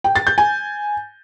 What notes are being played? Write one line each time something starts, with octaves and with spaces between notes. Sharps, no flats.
G5
A6
G6
G#5